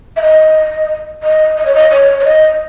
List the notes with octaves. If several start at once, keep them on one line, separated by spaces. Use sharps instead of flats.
E5
D#5
D#5
D#5
C#5
D#5
C#5
C#5
D#5